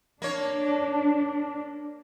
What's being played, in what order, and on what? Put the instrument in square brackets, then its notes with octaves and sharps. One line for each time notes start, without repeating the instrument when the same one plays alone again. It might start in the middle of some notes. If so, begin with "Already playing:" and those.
[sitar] A#3 C#5 [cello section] D4